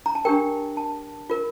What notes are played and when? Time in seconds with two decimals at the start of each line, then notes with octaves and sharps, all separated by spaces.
0.06 A#5
0.15 A5
0.25 D4 G4 A#4 G5
0.77 A5
1.30 F4 A#4